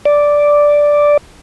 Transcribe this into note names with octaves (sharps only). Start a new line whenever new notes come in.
D5